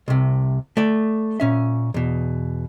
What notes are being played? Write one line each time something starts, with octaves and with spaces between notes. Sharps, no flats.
C2 C3
A3 D5
A#2 C#4 E5
E2 B2